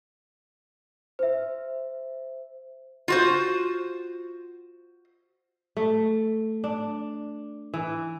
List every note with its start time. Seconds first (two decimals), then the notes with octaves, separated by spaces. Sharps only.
1.19 C5 E5
3.08 F4 F#4 C5
5.77 A3
6.64 D4
7.74 E3